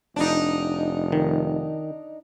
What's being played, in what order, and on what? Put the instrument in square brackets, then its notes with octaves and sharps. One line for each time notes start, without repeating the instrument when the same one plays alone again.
[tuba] F1 [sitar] D4 D#4
[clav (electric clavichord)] D#3